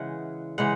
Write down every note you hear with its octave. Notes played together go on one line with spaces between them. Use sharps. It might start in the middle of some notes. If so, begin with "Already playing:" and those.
Already playing: C#3 E3 G#3 F#5
C#3 E3 G#3 F#5